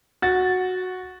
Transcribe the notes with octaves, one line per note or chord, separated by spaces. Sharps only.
F#4 A6